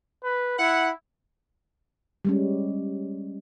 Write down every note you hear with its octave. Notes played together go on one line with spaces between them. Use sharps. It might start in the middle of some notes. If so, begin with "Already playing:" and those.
B4
E4 F#5
G3 G#3 C#4